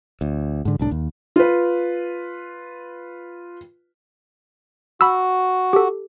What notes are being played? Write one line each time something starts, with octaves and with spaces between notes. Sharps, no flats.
D2
G#2 D3
C2 A2 D4
D#2
F4 B4
F#4 B5 E6
G4 A4